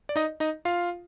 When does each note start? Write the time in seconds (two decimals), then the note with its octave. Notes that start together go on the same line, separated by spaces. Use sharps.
0.09 D5
0.16 D#4 D#5
0.40 D#4 D#5
0.65 F4 F5